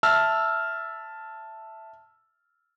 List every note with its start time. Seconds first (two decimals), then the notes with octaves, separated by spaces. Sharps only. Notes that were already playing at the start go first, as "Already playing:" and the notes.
0.03 E5 A5 E6 F6